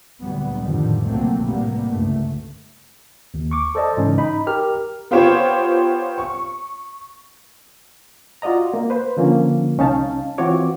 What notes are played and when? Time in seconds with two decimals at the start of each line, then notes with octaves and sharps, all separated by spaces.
0.20 D2 A#2 F#3 G3 B3
0.61 F2 A2 D3 D#3 F3 G3
1.05 C#2 B2 F#3 A3 A#3 C4
1.46 A2 C3 G3 A#3 B3
1.89 G1 C#2 A3
3.34 D#2
3.51 C#6 D6
3.75 A4 C5 D5 D#5 A5
3.97 G#2 C#3 E3 C#4 D#4
4.18 D#4 B5
4.47 G4 A#4 F6
5.11 B3 F4 G4 C5 C#5
6.18 C#6
8.42 F4 F#4 D5 D#5 A#5
8.74 A#3
8.90 B4 C5
9.17 D3 F3 A#3 C#4
9.78 C2 C#4 D#4 F5 A5
10.38 E3 C4 F4 F#4 C#5 D6